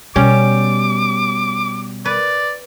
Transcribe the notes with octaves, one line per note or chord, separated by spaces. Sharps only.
B2 G3 C#4 D6
B4 D5